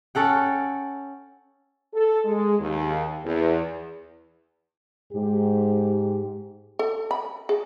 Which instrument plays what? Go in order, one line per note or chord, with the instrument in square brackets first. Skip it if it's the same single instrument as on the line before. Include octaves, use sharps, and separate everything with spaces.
[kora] C#4 A4 F#5 G5
[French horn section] A4
G#3
D#2
E2
G#2 G4
[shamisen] A4
B5
G#4